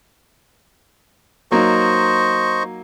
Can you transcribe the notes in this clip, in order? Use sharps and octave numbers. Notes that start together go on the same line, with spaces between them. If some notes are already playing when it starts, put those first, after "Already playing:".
F#3 A#3 D#4 C5 D#5 C#6